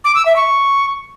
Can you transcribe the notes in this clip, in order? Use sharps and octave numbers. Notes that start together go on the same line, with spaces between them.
D6
E6
E5
C#6